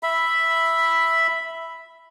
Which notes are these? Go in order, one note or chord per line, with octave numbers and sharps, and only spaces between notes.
E5 B5